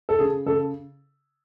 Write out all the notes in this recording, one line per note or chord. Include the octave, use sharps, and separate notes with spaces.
A4
C#3 G#4
C#3 A4